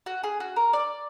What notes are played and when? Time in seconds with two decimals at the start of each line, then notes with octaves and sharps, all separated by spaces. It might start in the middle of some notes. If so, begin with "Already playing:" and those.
0.06 F#4
0.24 G#4
0.40 F#4
0.56 A#4
0.73 D5